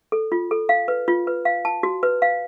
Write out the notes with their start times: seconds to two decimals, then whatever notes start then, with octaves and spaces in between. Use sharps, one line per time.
0.12 A4
0.32 F4
0.51 A4
0.69 F5
0.88 B4
1.08 F4
1.27 B4
1.45 F5
1.65 A5
1.83 F#4
2.03 B4
2.22 F5